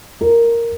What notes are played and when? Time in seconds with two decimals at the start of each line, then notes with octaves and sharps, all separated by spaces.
0.21 A#4